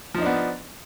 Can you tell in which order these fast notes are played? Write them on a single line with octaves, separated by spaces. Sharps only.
F3 D#4 D4 B3